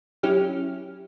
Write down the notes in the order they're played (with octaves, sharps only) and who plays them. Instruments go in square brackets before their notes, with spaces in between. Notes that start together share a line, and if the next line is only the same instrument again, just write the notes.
[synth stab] F#3 C#4 E4 G4 F6